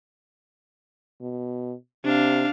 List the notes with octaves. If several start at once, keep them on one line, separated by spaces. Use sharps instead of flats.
B2
C3 D4 F5